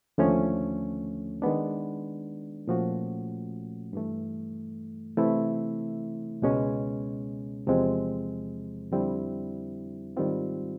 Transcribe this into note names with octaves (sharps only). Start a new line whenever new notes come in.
D#2 D3 F3 A3 C#4
D#3 G#3 B3 D4
A#2 F3 A3 C#4 F#4
G2 E3 A3
C3 E3 A3 C4 E4
C#2 B2 G#3 C#4
E2 C3 F3 G#3 C4
F2 D3 G3 C4 E4
G#2 D#3 G3 C4 F4